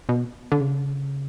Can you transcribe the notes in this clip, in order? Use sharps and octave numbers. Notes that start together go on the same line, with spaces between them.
B2
D3
C#3